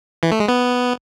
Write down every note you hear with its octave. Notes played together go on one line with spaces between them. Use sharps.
E3
A3
G#3
B3